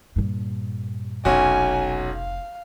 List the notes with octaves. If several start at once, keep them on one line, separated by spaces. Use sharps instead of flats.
G2 A#2
F1 B1 C#4 F#4 G#5
F5